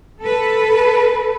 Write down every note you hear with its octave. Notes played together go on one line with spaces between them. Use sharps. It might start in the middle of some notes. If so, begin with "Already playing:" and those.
A4 B4